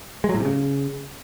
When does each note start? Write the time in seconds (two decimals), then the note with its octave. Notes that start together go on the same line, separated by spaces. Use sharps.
0.24 G#3
0.29 F#3
0.34 A2
0.40 C3
0.45 C#3